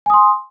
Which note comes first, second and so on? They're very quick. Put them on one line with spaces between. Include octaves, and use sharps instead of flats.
G#5 D#6 C6